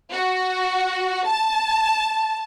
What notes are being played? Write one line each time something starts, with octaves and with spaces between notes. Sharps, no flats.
F#4
A5